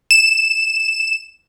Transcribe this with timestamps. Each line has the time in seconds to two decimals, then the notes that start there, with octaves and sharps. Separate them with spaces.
0.11 E7